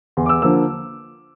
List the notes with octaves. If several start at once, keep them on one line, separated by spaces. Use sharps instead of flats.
E2 C6
D6
E6
D3 F3 A#3 E6